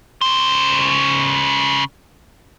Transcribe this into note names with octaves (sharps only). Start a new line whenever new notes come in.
C#3 C5